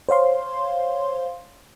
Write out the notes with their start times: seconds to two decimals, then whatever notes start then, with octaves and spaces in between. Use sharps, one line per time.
0.09 C5 C#5 F5 C6